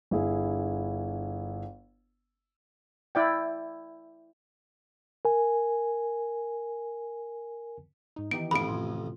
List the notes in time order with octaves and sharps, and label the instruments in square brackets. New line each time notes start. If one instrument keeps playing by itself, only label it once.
[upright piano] G1 E4 G#4
[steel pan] E4 D5 G5
[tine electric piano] A#4 G#5
[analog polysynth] G#2 D#4
[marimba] D#3 E3 E4 [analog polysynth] B3 D#4 G4 [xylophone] D7
[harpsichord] A1 F2 [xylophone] B5 D7
[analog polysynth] A2 C3 [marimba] F4 C6